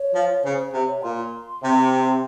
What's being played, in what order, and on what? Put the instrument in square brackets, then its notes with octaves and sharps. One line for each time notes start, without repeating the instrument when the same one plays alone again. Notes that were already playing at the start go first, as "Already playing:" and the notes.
Already playing: [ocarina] C#5
[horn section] F3
[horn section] C#3 [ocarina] C5
[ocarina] C5
[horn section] C3
[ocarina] C#5
[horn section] A#2 [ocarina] C6
[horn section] C3